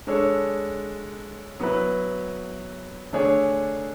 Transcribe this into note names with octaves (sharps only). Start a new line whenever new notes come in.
G#3 D4 A4 C#5
F#3 B3 E4 B4
D3 A3 D4 G#4 C#5